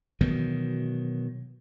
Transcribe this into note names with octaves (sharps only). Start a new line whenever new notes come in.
B2 D#3 E3 F#3